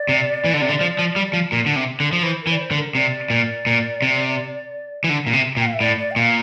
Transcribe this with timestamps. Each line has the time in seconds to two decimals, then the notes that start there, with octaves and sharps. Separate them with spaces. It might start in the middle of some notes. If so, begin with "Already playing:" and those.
Already playing: D5
0.09 C3
0.45 E3
0.54 D3
0.61 C3
0.69 D3
0.81 F3
0.99 F3
1.16 G3
1.33 F3
1.52 A#2
1.66 D3
1.76 C3
2.00 D3
2.13 F3
2.23 E3 C5
2.42 A#4
2.47 E3
2.51 D5
2.60 C5
2.71 D3
2.77 A#4
2.95 C3 D5
3.30 A#2
3.66 A#2
4.02 C3
5.04 E3
5.09 D3
5.27 A#2
5.33 C3
5.57 A#2
5.59 G5
5.66 F5
5.73 E5
5.80 A2 D5
5.99 D5
6.11 G5
6.16 A#2 F5